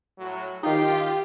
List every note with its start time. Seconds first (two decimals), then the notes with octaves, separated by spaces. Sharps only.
0.18 A2 F#3
0.63 D#3 D#4 F4 G4 G5